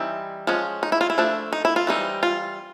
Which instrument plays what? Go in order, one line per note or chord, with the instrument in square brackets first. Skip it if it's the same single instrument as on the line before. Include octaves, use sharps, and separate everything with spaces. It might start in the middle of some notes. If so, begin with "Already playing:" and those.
Already playing: [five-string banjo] E3 G3 C4 D#4 E4
F3 G#3 C#4
D#4
E4
F4
E4
F3 A3 D4
D#4
E4
F4
E3 G3 C4 D#4
F4